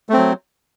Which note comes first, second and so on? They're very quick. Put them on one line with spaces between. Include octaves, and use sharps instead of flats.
A3 C4 F#3